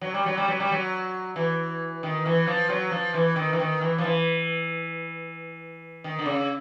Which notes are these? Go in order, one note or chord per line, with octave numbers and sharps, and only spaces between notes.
F#3
G3
F#3
G3
F#3
G3
F#3
E3
D#3
E3
F3
F#3
F3
E3
D#3
E3
D#3
E3
F3
E3
D#3
D3
C#3